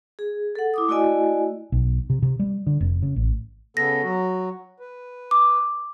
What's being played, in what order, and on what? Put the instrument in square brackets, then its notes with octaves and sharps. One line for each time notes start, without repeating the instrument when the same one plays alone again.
[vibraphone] G#4
A4 F#5
E4 D6 D#6
A3 E4 F#4 D5 D#5 G#5
[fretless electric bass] B1
C3
C3
G3
D3
F1
C#3
A1
[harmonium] C#3 B3 A4 [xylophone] A#6
[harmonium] F#3 F#4
B4
[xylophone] D6